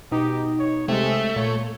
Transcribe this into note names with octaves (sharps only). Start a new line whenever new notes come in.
B2 D#4 G4
C#5
C3 G#3 A3 E5
A#2 C#5